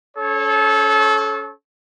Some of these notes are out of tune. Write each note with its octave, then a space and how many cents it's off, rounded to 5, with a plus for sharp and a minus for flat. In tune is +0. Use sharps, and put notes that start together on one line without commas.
C#4 +30 A4 -30 C#5 -25